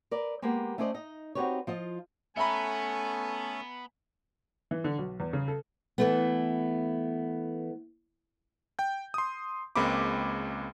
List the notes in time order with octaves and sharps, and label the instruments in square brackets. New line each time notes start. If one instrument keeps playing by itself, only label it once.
[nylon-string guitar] A#4 B4 D5
G#3 A#3 B3 G4 G#4
A3 C#4 G#4 C5 D5 D#5
D#4 D#5
C4 D#4 F#4 G4 B4 C#5
F3 F4 D#5
[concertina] A3 C#4 A4 [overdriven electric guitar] B3 [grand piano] E5 A#5 B5 [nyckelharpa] G#5
[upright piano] E3
D3
B1
E2
C#3
A4
[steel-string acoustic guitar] E3 A3 B3
[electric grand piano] G5 G6
C6 D#6
C#2 G#3 A#3 C4 B5 D6